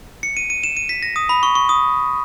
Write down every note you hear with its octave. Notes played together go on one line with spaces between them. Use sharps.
C#7
D#7
D#7
E7
D#7
B6
A#6
D#6
B5
C#6
C#6
D#6